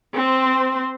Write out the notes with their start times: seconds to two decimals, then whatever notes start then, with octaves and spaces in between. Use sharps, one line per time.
0.14 C4 C5